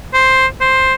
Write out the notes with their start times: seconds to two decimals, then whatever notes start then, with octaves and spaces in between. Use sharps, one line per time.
0.14 C5
0.61 C5